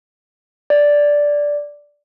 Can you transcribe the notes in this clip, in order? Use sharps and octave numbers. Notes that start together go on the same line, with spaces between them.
D5